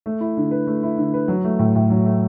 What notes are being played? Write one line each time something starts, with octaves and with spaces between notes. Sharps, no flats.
A3
E4
D3
B4
A3
E4
D3
B4
F#3
A3
A2
A2
F#3
A3